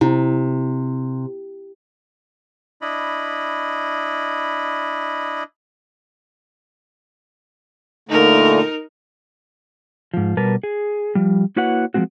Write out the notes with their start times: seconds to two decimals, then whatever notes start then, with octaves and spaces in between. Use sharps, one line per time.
0.01 C3 E4
2.82 D4 E4 D#5 B5
8.09 A#2 D3 A3 D#4 A#4
10.14 G#2 F3
10.37 B2 G3 A#4 B4 A5
10.63 G#4
11.15 F3 G3
11.56 A#3 E4 F#4 B4 C#5 F#5
11.94 F3 G3 G#3 C4 F#4